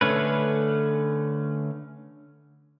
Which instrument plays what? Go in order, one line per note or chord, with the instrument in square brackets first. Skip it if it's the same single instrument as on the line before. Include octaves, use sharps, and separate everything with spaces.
[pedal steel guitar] D3 A3 C#4 B4